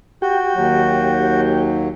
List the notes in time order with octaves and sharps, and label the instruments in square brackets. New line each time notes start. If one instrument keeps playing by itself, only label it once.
[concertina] F#4 [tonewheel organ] G4 G5
[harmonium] D#2 F#3